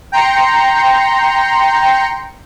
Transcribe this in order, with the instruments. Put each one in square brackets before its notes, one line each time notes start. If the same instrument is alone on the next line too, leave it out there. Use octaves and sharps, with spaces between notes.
[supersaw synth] G5 A#5 C6 C#7